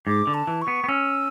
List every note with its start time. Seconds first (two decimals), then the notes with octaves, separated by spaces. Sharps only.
0.07 G#2 D6
0.27 D3
0.34 A5
0.47 E3
0.62 C#6
0.68 B3
0.84 B3
0.88 C#4 E6